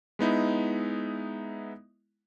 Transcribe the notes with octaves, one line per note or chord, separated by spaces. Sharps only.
G#3 B3 D#4 E4